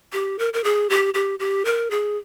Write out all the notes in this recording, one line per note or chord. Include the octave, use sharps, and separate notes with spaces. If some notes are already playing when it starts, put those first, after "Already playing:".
G4
A#4
A#4
G#4
G4
G4
G4
A#4
G#4